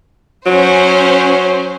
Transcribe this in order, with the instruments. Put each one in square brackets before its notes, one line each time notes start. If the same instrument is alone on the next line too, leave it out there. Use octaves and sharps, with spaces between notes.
[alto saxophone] F#3 [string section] C#4 C5